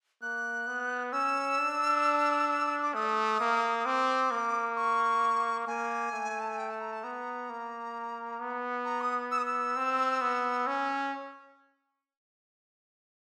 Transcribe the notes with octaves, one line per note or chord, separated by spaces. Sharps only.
A#3 F#6
B3
C#4 E6
D4
D6
A3 D#6
A#3
D#6
C4 D6
A#3
C#6
A#3 G#5
A3
A5
G#5
G5
A5
A#5
A5
B3 A#5
A#3
B3
A#5
D#6
E6
D#6
E6
C4
B3
C#4